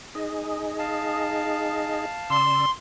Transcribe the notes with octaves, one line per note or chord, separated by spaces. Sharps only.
D#4 G#4 D#5
F5 A5
C#3 D5 C6 E6